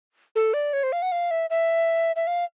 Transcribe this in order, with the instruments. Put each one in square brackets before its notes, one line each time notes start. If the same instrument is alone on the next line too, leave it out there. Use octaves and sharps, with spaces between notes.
[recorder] A4
D5
C#5
C5
F5
F#5
F5
E5
E5
E5
F5